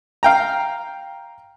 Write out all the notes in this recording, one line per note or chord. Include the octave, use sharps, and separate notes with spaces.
F5 G5 A#5